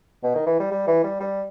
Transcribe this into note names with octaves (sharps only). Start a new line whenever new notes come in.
B2
D#3
E3
G3
G3
E3
G3
G3